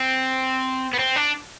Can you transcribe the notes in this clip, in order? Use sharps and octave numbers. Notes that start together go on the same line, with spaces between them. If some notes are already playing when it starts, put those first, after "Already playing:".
Already playing: C4
B3
C4
D4